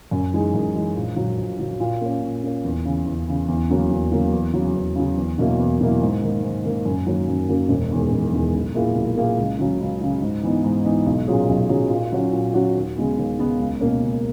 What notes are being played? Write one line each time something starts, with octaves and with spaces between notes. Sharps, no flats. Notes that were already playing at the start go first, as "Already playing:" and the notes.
F#2
E3 G#3 D#4
F#2
E3 G#3 D#4
A#1
A#2 F#3
A#1
A#2 F#3
A#2
A#3 C#4
A#2
A#3 C#4
E2
C#3 E3
E2
C#3 E3
E2
C#3 F#3 A#3
E2
C#3 F#3 A#3
E2
C#3 F#3
E2
C#3 F#3
E2
B2 F#3 A#3 E4
E2
B2 F#3 A#3 E4
G#2
D#3 A#3
G#2
D#3 A#3
F#2
D#3 F#3 A#3 C#4
F#2
D#3 F#3 A#3 C#4
E1
E2 D#3 G#3
E1
E2 D#3 G#3
B1
A#2 A#3 E4 G#4
B1
A#2 A#3 E4 G#4
C#2
C#3 F#3
C#2
C#3 F#3
G#2
E3 B3 D#4
G#2
E3 B3 D#4
B1
A#2 F#3 C#4 G#4
B1
A#2 F#3 C#4 G#4
A#2
F#3 C#4 F#4
A#2
F#3 C#4 F#4
D#2
C#3 G#3 B3
D#2
C#3 G#3 B3
C#2
B2 A#3 C#4
C#2